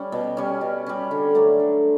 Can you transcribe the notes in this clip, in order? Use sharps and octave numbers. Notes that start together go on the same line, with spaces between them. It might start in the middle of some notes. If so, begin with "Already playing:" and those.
Already playing: G3 C#4
B2
G3 C#4
B2
G3 C#4
D3
F#3 A3 D4
D3